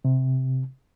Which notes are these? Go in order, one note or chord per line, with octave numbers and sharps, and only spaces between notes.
C3